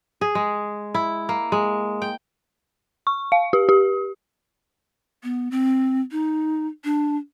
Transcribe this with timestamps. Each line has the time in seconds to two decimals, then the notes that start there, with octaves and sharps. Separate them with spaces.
0.21 G#4
0.35 G#3
0.94 E4
1.29 A#3
1.52 G#3
2.02 G5
3.07 C#6
3.32 F5
3.53 G4
3.69 G4
5.23 B3
5.51 C4
6.11 D#4
6.84 D4